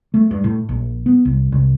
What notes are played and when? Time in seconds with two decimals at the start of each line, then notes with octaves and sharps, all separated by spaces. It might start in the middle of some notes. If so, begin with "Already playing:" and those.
0.14 A3
0.31 G2
0.44 A2
0.69 A#1
1.06 B3
1.25 C2
1.52 C2